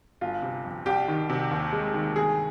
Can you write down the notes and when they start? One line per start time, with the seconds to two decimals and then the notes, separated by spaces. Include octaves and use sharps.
0.21 G1 F4
0.42 C3
0.65 F2
0.86 C2 G4
1.08 D#3
1.29 C3
1.51 D#2
1.72 G#3
1.94 D#3
2.16 G1 G#4